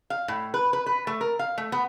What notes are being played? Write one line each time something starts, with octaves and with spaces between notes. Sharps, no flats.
F5
A2
B4
B4
B4
A3
A#4
F5
A3
B3